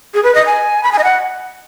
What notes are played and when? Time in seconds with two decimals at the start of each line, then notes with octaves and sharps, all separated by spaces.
0.14 G#4
0.23 B4
0.35 D#5
0.46 G#5
0.83 B5
0.92 G#5
0.99 D#5
1.04 F#5